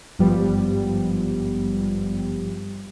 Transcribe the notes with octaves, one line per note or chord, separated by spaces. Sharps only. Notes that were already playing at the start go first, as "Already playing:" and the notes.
G#1 G2 F3 G3 B3